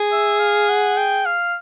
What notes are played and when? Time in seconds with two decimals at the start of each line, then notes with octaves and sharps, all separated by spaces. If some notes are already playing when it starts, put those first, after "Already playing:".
Already playing: G#4
0.12 E5
0.40 F5
0.69 F#5
0.97 G5
1.25 F5